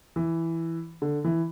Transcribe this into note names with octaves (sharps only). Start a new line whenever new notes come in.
E3
D3
E3